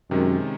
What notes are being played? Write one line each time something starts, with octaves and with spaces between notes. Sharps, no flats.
F#2 C3 D#3 G#3 C#4